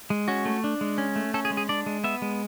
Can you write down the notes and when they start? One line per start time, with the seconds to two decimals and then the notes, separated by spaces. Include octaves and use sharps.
0.10 G#3
0.28 C#4 F#4
0.45 A3
0.64 D4
0.81 G#3
0.98 C#4
1.16 A3
1.34 C#4 A4
1.45 G#4
1.51 G#3
1.57 G#4
1.69 D4 D5
1.86 G#3
2.04 B3 E5
2.22 G#3